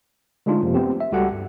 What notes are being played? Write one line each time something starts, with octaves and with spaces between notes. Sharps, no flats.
D3 G#3 A3 D4 D#4 F4
F#2 C3 F3 A#3
A3 B3 C4 G4
E5
C#2 G3 F#4 G4 A4 F#5
G2